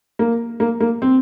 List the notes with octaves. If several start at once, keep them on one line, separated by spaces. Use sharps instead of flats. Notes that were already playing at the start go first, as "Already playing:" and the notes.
A#3
A#3
A#3
C4